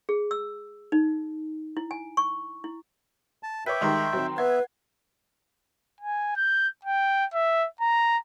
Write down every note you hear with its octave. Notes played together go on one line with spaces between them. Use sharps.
G#4
E6
D#4
E4
G#5
C#6
E4
A5
B4 C#5 E5 G5 D6 B6
D#3 G3 G#3 A#5 C6
D#3 F#3 C4
B3 B4 E5 F#5 G#6
G#5
G6
G5
E5
A#5